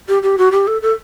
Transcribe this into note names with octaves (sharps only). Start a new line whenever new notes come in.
G4
G4
F#4
G4
A4
A4